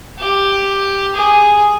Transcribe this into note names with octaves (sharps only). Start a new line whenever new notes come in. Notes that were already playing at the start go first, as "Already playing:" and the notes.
G4
G#4